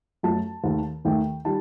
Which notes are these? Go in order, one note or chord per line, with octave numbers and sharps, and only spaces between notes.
F#2 F#3 A3 A5
D#2 D#3 A3
D#2 D#3 A3 G5
D#3 G3 A5